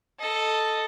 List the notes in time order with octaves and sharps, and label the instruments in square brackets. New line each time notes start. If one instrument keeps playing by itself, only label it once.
[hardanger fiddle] A4 D#5